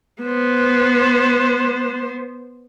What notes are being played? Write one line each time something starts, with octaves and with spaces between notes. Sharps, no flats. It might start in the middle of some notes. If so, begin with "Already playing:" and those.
B3 C5